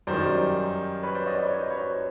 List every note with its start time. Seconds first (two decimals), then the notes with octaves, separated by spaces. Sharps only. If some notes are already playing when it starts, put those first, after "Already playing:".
0.07 F#2 D#3 G3 C5 D5
1.03 B4 C#5
1.15 C5 D5
1.26 C#5 D#5
1.38 C#5 D#5
1.50 C#5
1.60 C5
1.70 B4 C#5